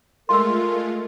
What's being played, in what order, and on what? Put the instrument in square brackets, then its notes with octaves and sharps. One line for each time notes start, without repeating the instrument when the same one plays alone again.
[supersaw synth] G#3 A3 F4 [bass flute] A#4 [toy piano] C6 E6